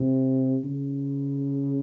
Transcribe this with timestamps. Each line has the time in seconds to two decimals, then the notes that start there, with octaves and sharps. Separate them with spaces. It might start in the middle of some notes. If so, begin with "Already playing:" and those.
Already playing: C3
0.65 C#3